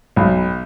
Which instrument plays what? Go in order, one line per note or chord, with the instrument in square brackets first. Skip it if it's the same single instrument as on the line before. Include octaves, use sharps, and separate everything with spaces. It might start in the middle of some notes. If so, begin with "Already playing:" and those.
[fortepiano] B1